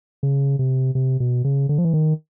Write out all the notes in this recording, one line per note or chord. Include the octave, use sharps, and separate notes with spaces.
C#3
C3
C3
B2
C#3
D3
F3
E3
D#3